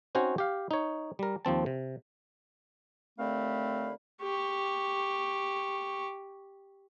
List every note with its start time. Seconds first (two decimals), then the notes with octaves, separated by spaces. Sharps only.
0.15 C4 C#4 D#4 F#4 C5 C#5
0.38 G4 F5
0.71 D#4 C#5
1.19 G3 A#4
1.45 D#2 F3 C4 A5
1.66 C3
3.19 D#2 D3 A3 C4 F5 B5
4.22 G4 C#6